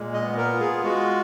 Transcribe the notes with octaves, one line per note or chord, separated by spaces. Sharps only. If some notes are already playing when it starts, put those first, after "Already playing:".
Already playing: A#2 G#3
D#5
B3
A#4
F4
G#4
G#3 F#4